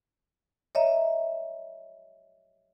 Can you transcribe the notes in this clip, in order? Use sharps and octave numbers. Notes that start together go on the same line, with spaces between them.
C#5 D#5 E5 A#5